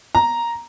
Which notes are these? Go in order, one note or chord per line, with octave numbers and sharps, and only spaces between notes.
A#5